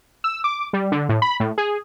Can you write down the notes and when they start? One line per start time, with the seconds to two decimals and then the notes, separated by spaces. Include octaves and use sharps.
0.24 E6
0.44 D6
0.73 G3
0.92 D3
1.09 A2
1.22 B5
1.40 A2
1.58 G#4